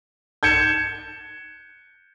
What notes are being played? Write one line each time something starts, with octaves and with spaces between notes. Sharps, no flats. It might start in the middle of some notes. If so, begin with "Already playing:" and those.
G6 G#6 C#7 E7